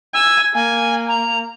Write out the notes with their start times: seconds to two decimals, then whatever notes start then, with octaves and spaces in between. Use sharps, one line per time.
0.14 G#5 E6
0.54 A#3 G#5
1.08 A#5